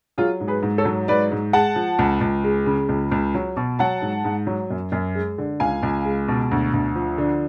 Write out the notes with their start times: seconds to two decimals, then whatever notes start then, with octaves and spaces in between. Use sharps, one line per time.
0.18 F#3 F4 G#4
0.40 G#2
0.48 G#4 B4
0.63 G#2
0.78 A4 C#5
0.85 F#3
1.08 G#2 B4 D5
1.32 G#2
1.53 G#3 F#5 A5
1.76 F3
1.99 C#2
2.21 C#2
2.44 G#3
2.66 C#3
2.89 C#2
3.12 C#2
3.35 F#3
3.57 B2
3.79 F#3 F#5 A5
4.02 G#2
4.25 G#2
4.47 F#3
4.70 F#2
4.92 F#2
5.15 G#3
5.38 D3
5.60 C#2 F5 G#5
5.83 C#2
6.05 G#3
6.28 B2
6.51 D2
6.73 D2
6.95 F3
7.18 D3